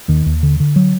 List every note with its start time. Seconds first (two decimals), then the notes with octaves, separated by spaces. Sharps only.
0.08 D#2 D#3
0.26 D#2
0.43 D3
0.60 D3
0.76 F#3